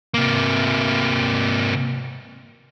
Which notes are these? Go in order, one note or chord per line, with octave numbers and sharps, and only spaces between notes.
C3 A#3